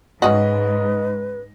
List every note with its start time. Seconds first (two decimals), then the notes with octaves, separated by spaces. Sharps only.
0.22 G#2 C#3 C#4 F#4 B4 D#5